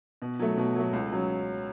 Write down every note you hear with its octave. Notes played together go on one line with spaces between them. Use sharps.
B2
F#3 A3
B2
F#3 A3
C#2
F#3 C#4